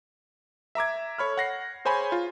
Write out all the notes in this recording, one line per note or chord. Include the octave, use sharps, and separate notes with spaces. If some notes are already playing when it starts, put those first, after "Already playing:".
E5 A#5 D6 G#6
A4 C#5 B5 F6
F#5 A#6 C7
G#4 C5 C#5 G#5 B5
F4